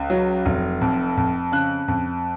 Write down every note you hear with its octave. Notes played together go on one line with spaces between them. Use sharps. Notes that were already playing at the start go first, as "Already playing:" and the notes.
Already playing: C#2
F#3
F1
F2
F2
C#3 F#6
F2